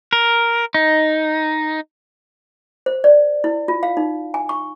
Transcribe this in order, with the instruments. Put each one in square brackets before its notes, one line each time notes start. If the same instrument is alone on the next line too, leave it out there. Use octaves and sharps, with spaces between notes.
[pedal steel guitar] A#4
D#4
[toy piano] C5
D5
E4
F4
F5
D#4
G#5
C#6